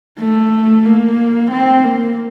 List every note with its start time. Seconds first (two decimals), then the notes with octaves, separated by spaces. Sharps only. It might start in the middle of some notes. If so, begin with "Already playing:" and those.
0.19 A3
0.85 A#3
1.51 C4
1.84 A#3